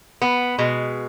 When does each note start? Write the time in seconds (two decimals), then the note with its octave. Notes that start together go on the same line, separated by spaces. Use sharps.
0.22 B3
0.59 B2 G#3